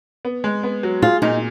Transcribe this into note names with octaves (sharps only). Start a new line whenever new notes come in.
B3
G#3
B3
F#3
F4 G#4
A#2 D#4